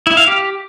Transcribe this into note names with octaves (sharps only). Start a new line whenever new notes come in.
E4
F5
G4